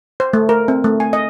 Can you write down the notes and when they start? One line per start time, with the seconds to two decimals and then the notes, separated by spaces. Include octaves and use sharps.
0.20 C5
0.33 A3
0.49 A#4
0.68 C4
0.84 A3
1.00 G#5
1.13 D#5